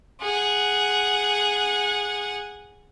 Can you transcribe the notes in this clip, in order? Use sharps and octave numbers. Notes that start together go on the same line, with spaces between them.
G#4 F#5